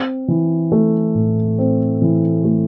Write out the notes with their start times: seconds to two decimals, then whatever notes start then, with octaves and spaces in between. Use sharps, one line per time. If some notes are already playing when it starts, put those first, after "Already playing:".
Already playing: C4
0.28 E3
0.72 A3
1.15 A2
1.58 C4
2.02 E3
2.44 A3